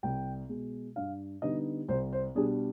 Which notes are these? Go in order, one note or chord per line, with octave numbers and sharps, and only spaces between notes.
C2 G5
B2 G#3
G2 F5
D3 G3 B3 D#4 D#5
C2 C5
C5
B2 G3 D4 G#4